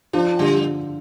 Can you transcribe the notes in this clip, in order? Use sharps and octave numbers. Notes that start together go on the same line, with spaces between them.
F3 D4
D3 G3